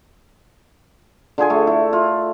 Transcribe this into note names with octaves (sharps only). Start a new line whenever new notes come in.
D3 F4 G#4 G#5
A3
E4
F4